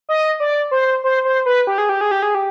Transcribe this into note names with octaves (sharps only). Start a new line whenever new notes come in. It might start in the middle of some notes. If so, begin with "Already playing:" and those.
D#5
D5
C5
C5
C5
B4
G4
G#4
G4
G#4
G4
G#4
G4